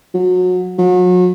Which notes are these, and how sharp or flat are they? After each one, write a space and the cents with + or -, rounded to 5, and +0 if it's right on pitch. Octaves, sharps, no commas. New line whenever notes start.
F#3 -25
F#3 -35